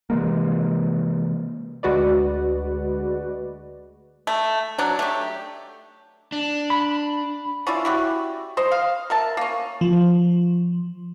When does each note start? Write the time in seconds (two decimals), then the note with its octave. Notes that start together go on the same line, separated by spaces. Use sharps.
0.10 C3 E3 G#3 A#3
1.83 D2 G#3 F#4 B4 D5
4.27 A3
4.78 F#3 D4
4.99 A3 G4
6.32 D4
6.70 B5
7.67 C#4 E4 F4 D5
7.85 E4 F#4 G4
8.57 C5 D#5
8.71 F5
9.10 A#4 E5 A5
9.37 A#3 C#4
9.81 F3